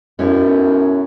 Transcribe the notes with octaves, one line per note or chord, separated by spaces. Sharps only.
B1 F#2 C#4 E4 C#5